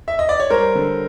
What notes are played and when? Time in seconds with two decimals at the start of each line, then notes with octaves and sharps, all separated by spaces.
0.08 E5
0.19 D#5
0.29 D5
0.40 C#5
0.50 G3 A#4 C5
0.75 D3